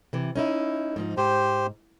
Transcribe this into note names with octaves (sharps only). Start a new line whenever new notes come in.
C3 E3
C#4 D#4 E4
G#2 F3 D#4
G#2 G4 C5